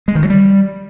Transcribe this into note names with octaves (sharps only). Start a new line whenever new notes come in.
G#3
D#3
F#3
G3